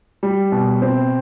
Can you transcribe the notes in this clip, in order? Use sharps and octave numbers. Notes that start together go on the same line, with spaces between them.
G3
B2
C4